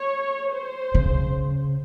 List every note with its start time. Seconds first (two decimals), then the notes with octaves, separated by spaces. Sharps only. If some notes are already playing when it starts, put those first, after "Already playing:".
Already playing: C#5
0.52 C5
0.94 C#3